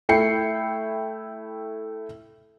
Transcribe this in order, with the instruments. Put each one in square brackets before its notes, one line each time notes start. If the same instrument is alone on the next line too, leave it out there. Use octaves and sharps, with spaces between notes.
[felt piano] A3 E4 G5 C7 C#7